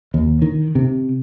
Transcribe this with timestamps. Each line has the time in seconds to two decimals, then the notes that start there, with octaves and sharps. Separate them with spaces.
0.14 D#2
0.42 D#3
0.75 C3